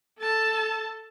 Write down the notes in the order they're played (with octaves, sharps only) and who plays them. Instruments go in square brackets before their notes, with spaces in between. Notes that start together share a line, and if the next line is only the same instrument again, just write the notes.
[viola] A4 A5